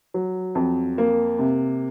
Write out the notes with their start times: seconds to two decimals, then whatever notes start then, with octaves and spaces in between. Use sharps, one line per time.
0.14 F#3
0.55 F2
0.98 A#3
1.39 C3